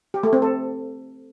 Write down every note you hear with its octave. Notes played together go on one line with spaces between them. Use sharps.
G4
A3
C4
A4